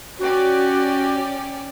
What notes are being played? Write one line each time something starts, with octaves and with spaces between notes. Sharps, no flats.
C#4 F#4 G4 D5